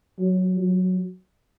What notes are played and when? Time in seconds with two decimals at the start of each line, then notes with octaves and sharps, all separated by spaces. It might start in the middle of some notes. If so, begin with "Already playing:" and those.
0.20 F#3
0.61 F#3